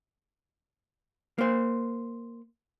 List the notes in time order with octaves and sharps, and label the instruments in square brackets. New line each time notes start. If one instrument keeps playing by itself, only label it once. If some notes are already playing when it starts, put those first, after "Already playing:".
[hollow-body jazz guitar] A#3 C5